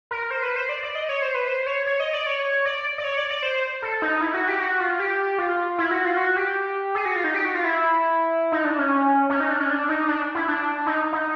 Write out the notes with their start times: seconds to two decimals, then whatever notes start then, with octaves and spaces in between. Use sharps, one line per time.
0.11 A#4
0.31 C5
0.42 B4
0.56 C5
0.69 D5
0.83 D5
0.95 D#5
1.09 C#5
1.22 C5
1.34 B4
1.48 C5
1.66 C#5
1.86 C#5
2.00 D#5
2.13 D5
2.26 C#5
2.65 D5
2.98 D5
3.04 C#5
3.17 D5
3.30 D5
3.43 C5
3.82 A4
4.02 D#4
4.21 E4
4.34 F#4
4.48 G4
4.60 F#4
4.80 F4
4.99 G4
5.38 F4
5.78 E4
5.91 F#4
6.05 F4
6.17 F#4
6.36 G4
6.95 G#4
7.05 F#4
7.16 F4
7.24 D#4
7.34 G4
7.45 F#4
7.55 F4
7.64 E4
8.52 D#4
8.64 D4
8.78 C#4
9.30 C#4
9.40 D#4
9.50 D4
9.60 C#4
9.70 D4
9.89 D#4
10.08 D4
10.35 E4
10.48 D4
10.87 D#4
11.13 D#4